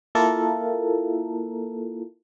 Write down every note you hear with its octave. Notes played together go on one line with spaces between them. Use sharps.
A#3 E4 F4 A4 A#4